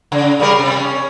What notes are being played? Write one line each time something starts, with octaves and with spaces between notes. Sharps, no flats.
C#3
C#3 G3 A#4
C3
C#4